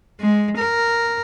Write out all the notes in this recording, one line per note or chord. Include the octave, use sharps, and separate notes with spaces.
G#3
A#4